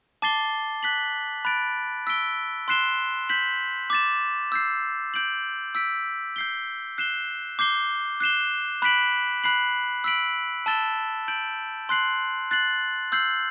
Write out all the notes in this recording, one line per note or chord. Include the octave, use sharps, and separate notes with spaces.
A5 D6 A6 C7 G7
F#6 B6 F#7
B5 F#6 A6 D7
E6 B6 D7 G7
C6 F#6 C7 E7 G7
G6 B6 F#7
D6 A6 E7
E6 G6 C7
G6 D7 F#7
E6 B6 D7
G6 C7 G7
F#6 C7 E7 G7
D6 G6 C7 G7
F#6 C7 E7 G7
B5 F#6 B6 D7 F#7
B5 F#6 C7 F#7
E6 B6 D7 F#7
A5 E6 A6 E7 G7
G6 D7 F#7
C6 F#6 C7 F#7
F#6 A6 C7 F#7
E6 G6 C7 F#7